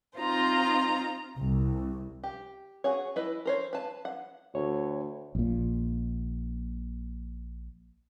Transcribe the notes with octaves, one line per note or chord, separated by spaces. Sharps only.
C4 D#4 F4 C5 A#5
C2
G4
F#4 G#4 C#5
E4 B4 D#5
A#4 C5 C#5
B4 A5
F#5
D2 C#5
A#1 A#2